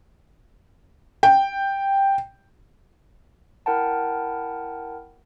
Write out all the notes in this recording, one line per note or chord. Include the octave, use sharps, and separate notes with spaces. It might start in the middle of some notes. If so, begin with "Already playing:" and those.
G5
E4 A#4 F#5 G5 A5